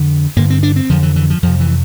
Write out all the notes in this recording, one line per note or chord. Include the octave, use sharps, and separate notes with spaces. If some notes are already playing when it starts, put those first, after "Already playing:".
Already playing: F2 D3
G2 D3 A#3
C4
D4
C4
F2 D3 F3
E3
E3
F3
F2 C3 F3
E3